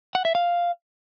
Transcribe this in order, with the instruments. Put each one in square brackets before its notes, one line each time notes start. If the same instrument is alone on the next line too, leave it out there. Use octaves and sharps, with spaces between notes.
[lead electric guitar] F#5
E5
F5